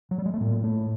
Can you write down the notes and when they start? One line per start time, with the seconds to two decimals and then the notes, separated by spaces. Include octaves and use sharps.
0.11 F#3
0.18 G3
0.26 G#3
0.34 A3
0.40 A2 A#3
0.64 A3